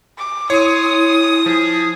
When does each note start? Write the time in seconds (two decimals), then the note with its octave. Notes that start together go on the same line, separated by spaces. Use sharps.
0.18 D6
0.50 E4 C#5 C6 D#6
1.46 F3 G#4